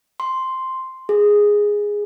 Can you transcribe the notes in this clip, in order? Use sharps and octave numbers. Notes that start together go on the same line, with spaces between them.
C6
G#4